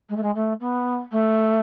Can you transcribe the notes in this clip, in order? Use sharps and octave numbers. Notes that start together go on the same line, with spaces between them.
G#3
A3
G#3
A3
B3
A3